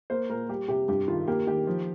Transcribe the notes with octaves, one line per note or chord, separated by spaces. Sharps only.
A#3 C5
A#2 A#4
G3 G4
C3 G4
G2 G4
D#3 F4
A#3 G4
D#3 G4
F3